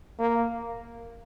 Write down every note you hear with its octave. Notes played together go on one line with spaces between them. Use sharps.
A#3